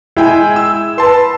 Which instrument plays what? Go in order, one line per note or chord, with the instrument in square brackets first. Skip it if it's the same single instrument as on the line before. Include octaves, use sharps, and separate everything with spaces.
[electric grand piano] G#3 G5 G#5 [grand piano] E4
[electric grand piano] E6
[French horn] B4 [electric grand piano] A5 C6